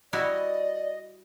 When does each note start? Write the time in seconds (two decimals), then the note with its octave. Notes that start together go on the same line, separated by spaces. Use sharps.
0.13 G3 E4 F#4 D5 D#5